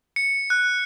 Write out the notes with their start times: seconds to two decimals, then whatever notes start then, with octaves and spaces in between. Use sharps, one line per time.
0.16 C#7
0.50 F#6